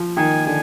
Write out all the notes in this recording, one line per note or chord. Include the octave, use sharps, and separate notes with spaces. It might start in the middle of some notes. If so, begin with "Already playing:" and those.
Already playing: F3
D#3 G#5
D3 G#5